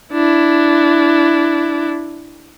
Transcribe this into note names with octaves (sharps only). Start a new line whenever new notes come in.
D4 E4